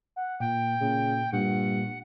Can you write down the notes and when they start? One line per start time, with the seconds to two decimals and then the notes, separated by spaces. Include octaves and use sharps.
0.16 F#5
0.40 A#2 G5
0.81 A#2 C#3
1.32 G2 A#2 F#5